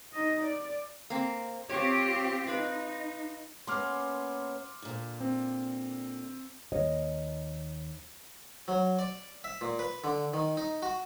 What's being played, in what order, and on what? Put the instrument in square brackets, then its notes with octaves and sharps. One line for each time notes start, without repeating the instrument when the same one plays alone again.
[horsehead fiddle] D#4 D#5
D5
[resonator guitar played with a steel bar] A#3 C4
[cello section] C4 F4 G4 [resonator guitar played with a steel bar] C#5
[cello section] D#4 [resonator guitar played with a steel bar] F4 B4
[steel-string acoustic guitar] A#3 B3 C#4 [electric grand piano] C6 D6 F6
[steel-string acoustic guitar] A#2 D3
[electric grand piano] C4
[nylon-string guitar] D#2 C#5 D#5
[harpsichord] F#3
D5
E5
A#2
B4
D3
D#3
D#4
F#4